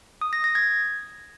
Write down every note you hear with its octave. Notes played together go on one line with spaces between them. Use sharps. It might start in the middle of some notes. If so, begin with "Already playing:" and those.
D#6
A#6
A#6
G#6